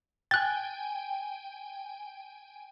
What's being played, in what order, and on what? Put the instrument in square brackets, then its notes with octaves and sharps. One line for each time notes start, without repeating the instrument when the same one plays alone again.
[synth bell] G5 G#5 [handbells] F#6 A6